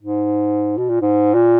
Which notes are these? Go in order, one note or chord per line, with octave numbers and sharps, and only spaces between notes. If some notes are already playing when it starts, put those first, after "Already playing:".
G#2
B2
A#2
G#2
A#2